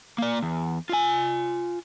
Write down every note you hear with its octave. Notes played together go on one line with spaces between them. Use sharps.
A#3 D5
E2
F4 G#5